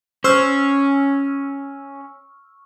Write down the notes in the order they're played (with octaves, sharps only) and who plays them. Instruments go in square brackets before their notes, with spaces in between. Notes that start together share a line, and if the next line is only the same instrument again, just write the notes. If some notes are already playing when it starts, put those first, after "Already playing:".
[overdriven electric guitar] C#4 [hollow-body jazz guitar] C5 [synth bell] C#6 E6 F6